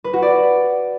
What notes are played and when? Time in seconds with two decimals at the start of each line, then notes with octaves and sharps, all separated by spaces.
0.04 B4
0.13 F#4
0.22 D5